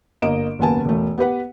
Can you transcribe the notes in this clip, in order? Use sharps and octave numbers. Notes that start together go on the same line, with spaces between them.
G1 A#3 D#5 D7 E7
F#1 D#2 B3 G#5 A5
E1 A3
B3 G4 B4 F#5